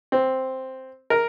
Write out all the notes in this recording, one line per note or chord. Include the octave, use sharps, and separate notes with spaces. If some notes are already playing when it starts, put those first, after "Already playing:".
C4
A#4